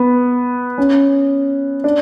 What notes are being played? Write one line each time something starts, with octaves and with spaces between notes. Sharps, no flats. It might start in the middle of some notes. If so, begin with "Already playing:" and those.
Already playing: B3
C#4
D4